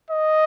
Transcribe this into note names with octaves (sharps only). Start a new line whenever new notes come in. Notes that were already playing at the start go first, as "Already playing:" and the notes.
D#5